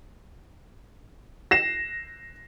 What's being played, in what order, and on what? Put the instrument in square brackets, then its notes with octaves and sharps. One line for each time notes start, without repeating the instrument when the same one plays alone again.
[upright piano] A#6 C7 E7